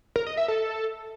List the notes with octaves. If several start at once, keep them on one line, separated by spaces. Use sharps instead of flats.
A#4
D#5
E5
A4